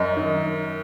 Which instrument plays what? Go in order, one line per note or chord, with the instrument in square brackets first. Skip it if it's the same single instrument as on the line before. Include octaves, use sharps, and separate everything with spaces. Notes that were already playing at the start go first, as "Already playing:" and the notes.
Already playing: [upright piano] F#2 [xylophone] D#5
[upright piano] D#3